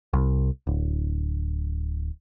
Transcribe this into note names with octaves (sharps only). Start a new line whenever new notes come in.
C2
D1